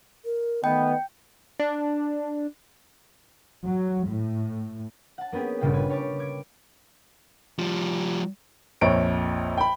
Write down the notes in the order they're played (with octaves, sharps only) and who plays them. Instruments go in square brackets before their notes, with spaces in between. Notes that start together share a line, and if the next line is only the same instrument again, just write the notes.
[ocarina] A#4
[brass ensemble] D#3 A3 B3 [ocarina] D#5 [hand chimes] G5
[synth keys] D4
[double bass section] F#3
A2
[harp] F#5 A5
A#3 B3 C#4 G4 G#4
G1 A#2 C#3 F4 G5
B4 G#5
G4 C#5 A5 C#6 D6
D6 G#6
[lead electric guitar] F3 G3
[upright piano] A#1 F2 C#5 D7
G5 B5